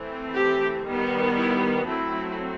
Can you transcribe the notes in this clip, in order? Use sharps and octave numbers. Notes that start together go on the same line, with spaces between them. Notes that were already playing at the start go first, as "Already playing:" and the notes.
Already playing: E3 A3 C4
G4
D#3 G3 B3
E4
F#3 A3 C4 E4